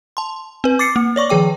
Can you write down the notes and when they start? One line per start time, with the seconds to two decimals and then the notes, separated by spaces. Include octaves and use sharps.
0.17 A5 C6
0.64 C4 B4
0.79 D6 A6 C7 C#7
0.96 A#3
1.16 C#5 D5 C#6 D6
1.29 D#3 F3 G#4 G5 D6